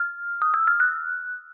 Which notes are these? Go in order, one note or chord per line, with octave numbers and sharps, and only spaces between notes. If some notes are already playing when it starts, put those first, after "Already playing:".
Already playing: F6
D#6
E6
F6
F#6